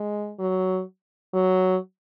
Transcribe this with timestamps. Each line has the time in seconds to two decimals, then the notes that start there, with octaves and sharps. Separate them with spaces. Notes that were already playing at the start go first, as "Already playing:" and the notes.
Already playing: G#3
0.39 F#3
1.34 F#3